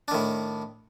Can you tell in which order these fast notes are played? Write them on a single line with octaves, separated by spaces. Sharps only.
D4 D#3 A2